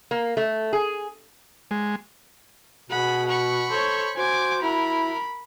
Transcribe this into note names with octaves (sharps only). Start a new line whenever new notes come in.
A#3
A3
G#4
G#3
B2 G#4 F#5 B5
F#5 B5 C#6
A4 C5 C#5
F#4 C5 G#5 D6
E4 A#4 B5